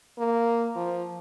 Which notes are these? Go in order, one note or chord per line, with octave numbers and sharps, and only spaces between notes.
A#3
F3